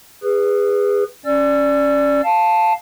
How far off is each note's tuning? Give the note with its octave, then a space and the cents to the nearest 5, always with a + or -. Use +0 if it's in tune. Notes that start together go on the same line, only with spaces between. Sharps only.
G#4 -25 B4 +0
C#4 +0 D5 +0 E6 +40
F5 +0 A5 +0